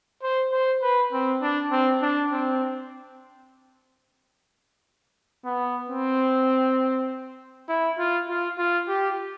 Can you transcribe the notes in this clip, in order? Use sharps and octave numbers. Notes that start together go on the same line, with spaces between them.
C5
C5
B4
C4
D4
C4
D4
C4
B3
C4
E4
F4
F4
F4
G4